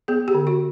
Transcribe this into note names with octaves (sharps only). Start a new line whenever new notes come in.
B3 G#4
G4
D3
F#4